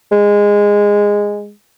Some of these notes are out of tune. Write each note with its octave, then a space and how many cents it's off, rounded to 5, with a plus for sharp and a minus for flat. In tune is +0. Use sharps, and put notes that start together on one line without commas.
G#3 -15